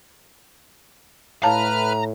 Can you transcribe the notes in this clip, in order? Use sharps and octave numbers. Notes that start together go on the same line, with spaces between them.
A2 B4 C#5 F5 A5 A#5 F6